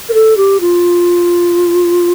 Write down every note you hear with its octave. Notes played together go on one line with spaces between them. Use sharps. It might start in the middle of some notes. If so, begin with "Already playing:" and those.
A#4
A4
G4
F4